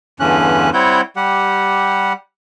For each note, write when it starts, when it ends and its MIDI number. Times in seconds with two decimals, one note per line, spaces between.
0.20 0.70 40
0.20 0.70 43
0.20 0.70 50
0.20 0.70 52
0.20 0.70 61
0.20 0.70 90
0.74 1.01 55
0.74 1.01 60
0.74 1.01 64
0.74 1.01 73
0.74 1.01 78
0.74 1.01 91
1.16 2.13 55
1.16 2.13 67
1.16 2.13 78